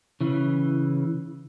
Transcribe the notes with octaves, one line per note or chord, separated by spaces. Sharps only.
C#3 E3